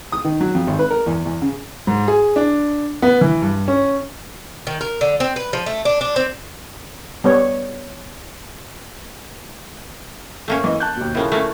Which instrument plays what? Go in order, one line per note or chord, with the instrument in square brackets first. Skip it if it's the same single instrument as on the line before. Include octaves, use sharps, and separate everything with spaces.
[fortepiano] D#6
D#3
F#3
F2
G#1
B4
A#4
E2
E2
C#3
[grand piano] G#2
G#4
D4
B3
E3
G2
C#4
[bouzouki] D#3
A#4
D3
C4
B4
F3
A3
D4
D4
C4
[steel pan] G3 B3 C#5
[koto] A3 A#3 C#4
[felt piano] E3 D#5
A5 F#6 G6
D#2 B2
[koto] A2 C#3 F3 [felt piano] E4 A#4
[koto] A3 A#3 C#4